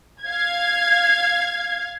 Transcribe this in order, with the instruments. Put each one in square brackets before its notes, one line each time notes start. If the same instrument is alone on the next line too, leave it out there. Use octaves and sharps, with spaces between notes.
[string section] F5 G#6